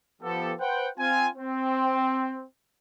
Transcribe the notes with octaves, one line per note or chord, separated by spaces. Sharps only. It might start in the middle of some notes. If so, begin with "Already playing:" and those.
F3 B3 G4 A4
B4 C5 F#5 G5
C4 F4 G#5
C4